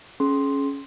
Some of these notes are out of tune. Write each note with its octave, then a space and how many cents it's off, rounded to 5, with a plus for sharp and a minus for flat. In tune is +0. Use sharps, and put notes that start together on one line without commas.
C#4 +0 G#4 +35 C6 +0